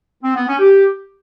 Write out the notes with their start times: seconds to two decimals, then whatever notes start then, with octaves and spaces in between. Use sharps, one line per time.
0.23 C4
0.35 B3
0.47 C#4
0.59 G4